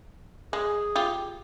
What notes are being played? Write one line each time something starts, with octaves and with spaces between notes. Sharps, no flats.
G#3 G#4
F4 G4